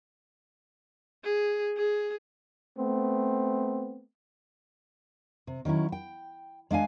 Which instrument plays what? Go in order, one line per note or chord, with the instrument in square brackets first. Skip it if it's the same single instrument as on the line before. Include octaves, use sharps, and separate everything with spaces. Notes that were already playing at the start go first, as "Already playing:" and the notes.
[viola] G#4
G#4
[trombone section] A3 B3 C4
[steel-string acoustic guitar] C3
D#3 F#3 C#4 E4
G5
G#3 D4 F5 G#5